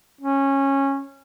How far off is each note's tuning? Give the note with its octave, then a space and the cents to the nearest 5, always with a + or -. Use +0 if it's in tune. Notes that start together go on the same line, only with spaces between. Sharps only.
C#4 -15